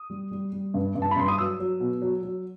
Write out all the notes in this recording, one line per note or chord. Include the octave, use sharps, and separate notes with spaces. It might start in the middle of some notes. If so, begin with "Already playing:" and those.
Already playing: D#6
G3
G3
G3
G2
G2
A5
B5
G2 C6
D#6
F#3 E6
F#3
B2
F#3
F#3